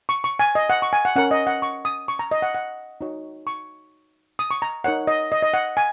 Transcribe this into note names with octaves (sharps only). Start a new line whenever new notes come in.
C#6
C#6
G#5
D#5
F#5
C#6
G#5
F#5
C#4 A#4 C#5 F#5
D#5
F#5
C#6
D#6
C#6
A#5
D#5
F#5
F#5
D#4 F#4 C#5
C#6
D#6
C#6
A#5
D#4 A#4 C#5 F#5
D#5
D#5
D#5
F#5
G#5